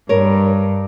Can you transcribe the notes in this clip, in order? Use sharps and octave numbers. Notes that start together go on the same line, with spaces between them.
G2 A#4 C#5